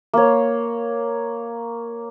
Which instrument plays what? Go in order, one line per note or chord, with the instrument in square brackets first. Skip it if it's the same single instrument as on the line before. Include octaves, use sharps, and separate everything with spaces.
[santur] A#3 C#5